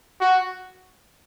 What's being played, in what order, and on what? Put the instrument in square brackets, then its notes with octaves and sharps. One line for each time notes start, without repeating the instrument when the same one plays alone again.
[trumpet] F#4